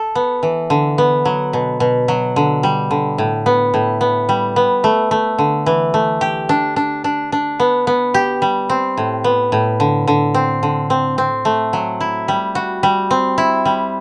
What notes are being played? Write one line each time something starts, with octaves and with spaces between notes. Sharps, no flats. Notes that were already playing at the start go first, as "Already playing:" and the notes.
Already playing: A4
B3
E3
D3
B3
F#3
B2
B2
F#3
D3
G3
D3
A2
B3
A2
B3
G3
B3
A3
A3
D3
E3
A3
G4
D4
D4
D4
D4
B3
B3
G4
G3
C4
A2
B3
A2
D3
D3
C4
D3
C4
C4
A3
F#3
E4
G3
F#4
G3
C4
E4
G3